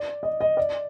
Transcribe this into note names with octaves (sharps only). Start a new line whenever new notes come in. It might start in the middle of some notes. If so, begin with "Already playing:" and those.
Already playing: D5
D#5
D#5
D5